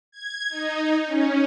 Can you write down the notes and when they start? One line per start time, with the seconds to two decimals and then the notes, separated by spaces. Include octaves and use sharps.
0.11 G#6
0.49 D#4
1.06 C#4